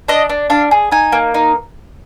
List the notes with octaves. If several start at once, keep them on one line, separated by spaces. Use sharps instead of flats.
D4 D#5
D4
D4 F5
G#4
D#4 G#5
A#3
D#4